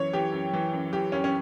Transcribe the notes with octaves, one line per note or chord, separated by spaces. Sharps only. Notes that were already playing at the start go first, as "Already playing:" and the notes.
Already playing: F#2 E3 C#5
E3 G4
F#2
E3
F#2
E3 G4
F#2 C#4
C#4